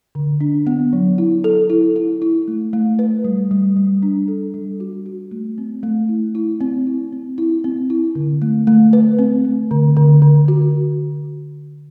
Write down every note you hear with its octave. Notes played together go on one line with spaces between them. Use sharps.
D3
D4
B3
F#3
E4
A4
E4
E4
E4
A3
A3
B4
G3
G3
G3
D4
A4
G3
F#4
F#4
A3
C4
A3
E4
E4
C4
E4
C4
E4
C4
E4
D3
A3
A3
B4
C4
A3
D3
D3
D3
F#4